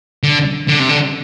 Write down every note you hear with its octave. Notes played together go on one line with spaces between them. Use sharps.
D3
D3
C3
D3